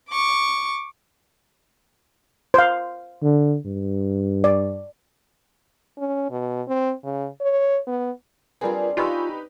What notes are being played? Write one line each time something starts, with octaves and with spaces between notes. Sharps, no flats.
C#6 D6
C5 F5
D3
G2
D5
C#4
B2
C4
C#3
C#5
B3
G3 C4 D4 F4 G#4 A#4 B4
D#4 F4 G4 B4 G#5 C#6 E6